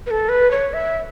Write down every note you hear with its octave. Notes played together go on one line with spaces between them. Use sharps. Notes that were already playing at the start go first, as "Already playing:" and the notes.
B4
A4
B4
C#5
E5